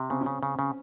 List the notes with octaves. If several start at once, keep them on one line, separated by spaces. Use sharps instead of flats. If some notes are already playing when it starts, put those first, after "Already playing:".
Already playing: C3
C#3 C4
C#4
C#3
C#3
C#3